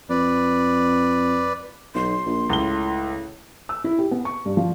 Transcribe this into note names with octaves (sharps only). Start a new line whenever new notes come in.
F2 B4 D5
B1 C6
A#1
C#2 A2 G7
E6
E4
G4
B3
C#6
G2
F3